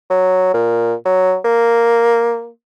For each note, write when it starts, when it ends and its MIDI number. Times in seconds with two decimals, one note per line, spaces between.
0.10 0.50 54
0.54 0.94 46
1.05 1.37 54
1.45 2.49 58